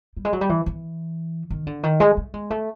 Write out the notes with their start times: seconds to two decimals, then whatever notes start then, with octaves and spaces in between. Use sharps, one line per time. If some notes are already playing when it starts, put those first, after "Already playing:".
0.17 G3
0.25 G#3
0.33 F#3
0.41 G3
0.49 E3
0.66 E3
1.50 D#3
1.67 D3
1.83 D#3
2.00 G#3
2.17 A3
2.34 G#3
2.50 A3